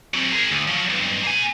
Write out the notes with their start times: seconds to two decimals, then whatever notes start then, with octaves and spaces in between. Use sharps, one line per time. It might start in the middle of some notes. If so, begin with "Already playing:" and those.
0.14 F#3 C4
0.32 G#4 A#4
0.51 D2
0.68 F3 F#3
0.90 B1 G2
1.24 A#3 G#5